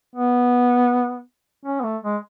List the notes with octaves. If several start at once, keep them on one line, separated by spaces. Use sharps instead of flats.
B3
C#4
B3
A3
G#3